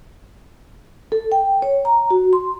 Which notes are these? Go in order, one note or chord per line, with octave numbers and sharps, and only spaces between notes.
A4
G5
C#5
A#5
F#4
C6